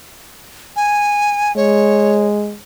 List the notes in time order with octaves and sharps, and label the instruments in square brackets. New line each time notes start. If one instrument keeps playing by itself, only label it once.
[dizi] G#5
[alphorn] G#3 [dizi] C#5